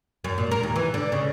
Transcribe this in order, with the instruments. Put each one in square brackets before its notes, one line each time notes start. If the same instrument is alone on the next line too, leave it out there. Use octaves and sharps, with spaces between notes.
[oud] F#2
A#2
A#4
D#2
E3
D3
C#3